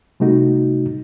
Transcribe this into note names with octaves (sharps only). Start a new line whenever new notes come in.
C3 G3 A3 D#4 F#4